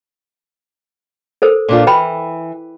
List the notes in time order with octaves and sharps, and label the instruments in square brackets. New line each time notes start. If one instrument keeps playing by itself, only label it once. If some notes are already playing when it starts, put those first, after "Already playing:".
[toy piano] A4 A#4 C5
[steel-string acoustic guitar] A#2 D4 F4
[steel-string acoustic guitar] E3 [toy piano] B4 G5 B5